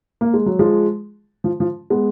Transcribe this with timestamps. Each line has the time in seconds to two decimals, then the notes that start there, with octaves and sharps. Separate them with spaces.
0.21 A#3
0.34 G#3
0.46 F#3
0.59 F3 G#3
1.44 F3
1.60 F3
1.90 G#3 B3